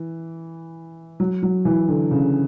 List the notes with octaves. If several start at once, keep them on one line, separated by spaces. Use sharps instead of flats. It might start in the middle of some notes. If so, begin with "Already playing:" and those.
Already playing: E3
F#3
F#3
E3
D3
C#3